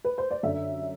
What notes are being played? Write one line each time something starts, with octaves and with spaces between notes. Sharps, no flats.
B4
C5
D5
F#2 D3 E5